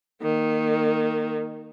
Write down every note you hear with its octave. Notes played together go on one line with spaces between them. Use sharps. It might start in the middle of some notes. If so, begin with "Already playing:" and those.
D#3 A#3